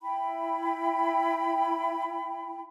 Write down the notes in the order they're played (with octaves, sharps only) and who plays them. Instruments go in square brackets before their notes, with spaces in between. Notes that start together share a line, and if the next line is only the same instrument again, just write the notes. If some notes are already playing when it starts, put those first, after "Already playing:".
[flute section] E4 G5 B5